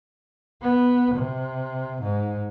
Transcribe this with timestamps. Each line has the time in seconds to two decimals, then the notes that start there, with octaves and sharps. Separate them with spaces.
0.62 B3
1.15 C3
2.02 G#2